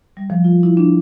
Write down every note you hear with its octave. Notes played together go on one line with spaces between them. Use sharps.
G3
F3
F4
E4
D4